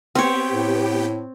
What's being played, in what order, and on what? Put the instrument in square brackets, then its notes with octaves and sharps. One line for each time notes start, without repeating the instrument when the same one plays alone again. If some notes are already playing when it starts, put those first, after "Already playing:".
[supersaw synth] B3 G4 G5 [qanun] C4 C#5
[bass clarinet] A2